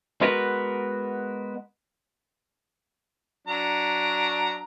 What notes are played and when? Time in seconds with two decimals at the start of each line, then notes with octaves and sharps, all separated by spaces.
0.21 G#3 B3 F#4 A#4 B4
3.48 F#3 D4 A#5